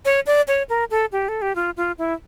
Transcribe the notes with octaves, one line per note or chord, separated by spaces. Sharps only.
C#5
D5
C#5
A#4
A4
G4
A4
G4
F4
F4
E4